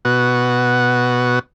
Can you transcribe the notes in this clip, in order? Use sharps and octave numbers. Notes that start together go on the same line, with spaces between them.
B2 F#4